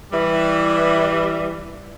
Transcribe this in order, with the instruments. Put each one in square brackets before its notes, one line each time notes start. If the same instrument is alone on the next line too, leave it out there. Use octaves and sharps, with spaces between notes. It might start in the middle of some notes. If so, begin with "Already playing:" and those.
[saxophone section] E3 G3